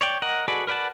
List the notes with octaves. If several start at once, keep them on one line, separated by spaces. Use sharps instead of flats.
C#5 D5 G5
A#4 D#5 F#5
F#4 G#4 A4 B4 D5
A#4 B4 D5 F#5 A5